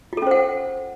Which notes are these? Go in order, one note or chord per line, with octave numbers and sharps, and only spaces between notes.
C#4 F4 A4 C5 F#5